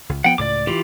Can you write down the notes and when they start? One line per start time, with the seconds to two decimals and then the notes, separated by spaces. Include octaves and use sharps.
0.09 C#2
0.24 F3 B3 F#5 G5
0.38 C#2 A2 D5 D6
0.67 E3 F4 G4